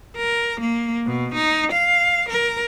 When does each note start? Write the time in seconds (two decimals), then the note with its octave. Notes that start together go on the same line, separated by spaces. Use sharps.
0.16 A#4
0.60 A#3
1.05 B2
1.34 D#4
1.72 F5
2.29 A#4